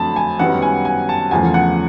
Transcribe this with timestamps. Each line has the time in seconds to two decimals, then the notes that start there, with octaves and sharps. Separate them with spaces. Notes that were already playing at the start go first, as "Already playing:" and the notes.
Already playing: F2 D3 F#3 A3 A5 B5
0.16 G#5
0.39 F#2 D#3 G3 B3 F#5
0.62 G#5
0.85 G#5
1.09 A5
1.31 E2 C#3 F3 A3 G#5
1.54 F#5